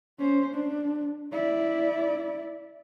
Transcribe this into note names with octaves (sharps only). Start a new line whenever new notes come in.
C#4 C5
D4
E4 D5